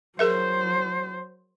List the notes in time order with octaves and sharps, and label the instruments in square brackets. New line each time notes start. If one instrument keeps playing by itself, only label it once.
[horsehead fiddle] F#3 C5 [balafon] G#4 A#4 E5